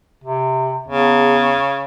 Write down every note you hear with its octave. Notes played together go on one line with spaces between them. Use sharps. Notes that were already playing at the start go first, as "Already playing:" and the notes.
C3
E2 C#3